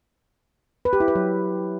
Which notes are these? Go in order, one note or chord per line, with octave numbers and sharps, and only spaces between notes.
B4
G4
E4
B4
F#3